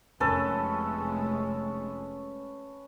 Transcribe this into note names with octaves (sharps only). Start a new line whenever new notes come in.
F1 G#3 A3 C#4 A4 B4